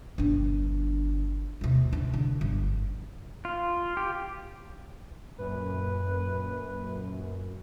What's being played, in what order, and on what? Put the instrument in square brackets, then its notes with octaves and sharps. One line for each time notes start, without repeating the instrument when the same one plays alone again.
[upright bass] G1 D4
D#2 C3
D2 E4
D3
G1
[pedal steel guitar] F4
G4
[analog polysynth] F#2 A#2 [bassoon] B4